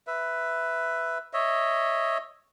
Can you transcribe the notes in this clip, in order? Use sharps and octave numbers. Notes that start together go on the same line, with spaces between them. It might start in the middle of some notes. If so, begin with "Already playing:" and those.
B4 E5
C#5 D#5 E5